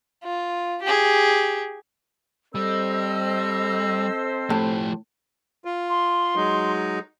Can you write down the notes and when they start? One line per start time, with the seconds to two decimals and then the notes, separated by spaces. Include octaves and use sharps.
0.23 F4
0.82 G4 G#4
2.55 G3 C4 A4 C5 D#5 E6
4.50 A2 F3 G4
5.65 F4
5.90 C6
6.36 F#3 G#3 D#4